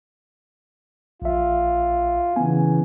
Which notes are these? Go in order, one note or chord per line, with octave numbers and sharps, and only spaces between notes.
A#1 F4 E5
C#3 E3 B3 G#5